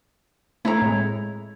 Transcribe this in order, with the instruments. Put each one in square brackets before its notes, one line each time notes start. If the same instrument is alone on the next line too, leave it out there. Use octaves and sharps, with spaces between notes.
[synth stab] A3 C4 A4 [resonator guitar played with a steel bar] E4 C#5 A#5
[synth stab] A2 G#3